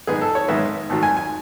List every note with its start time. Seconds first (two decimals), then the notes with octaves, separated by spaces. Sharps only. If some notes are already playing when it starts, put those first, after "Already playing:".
0.07 G#2 D#3 G#3 B3 G#4
0.21 A4
0.35 C#5
0.48 G#2 D#3 G#3 B3 E5
0.90 G#2 D#3 F#3 A3
1.03 G#5
1.17 G#5